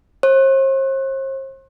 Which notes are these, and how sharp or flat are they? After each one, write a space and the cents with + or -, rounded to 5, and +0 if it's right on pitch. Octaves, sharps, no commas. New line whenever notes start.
C5 +45